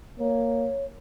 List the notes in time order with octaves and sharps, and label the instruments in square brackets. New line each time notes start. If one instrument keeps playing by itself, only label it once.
[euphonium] A#3 [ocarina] C#5